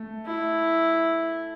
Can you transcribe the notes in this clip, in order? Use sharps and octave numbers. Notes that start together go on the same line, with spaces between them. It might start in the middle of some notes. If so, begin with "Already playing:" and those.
Already playing: A3
E4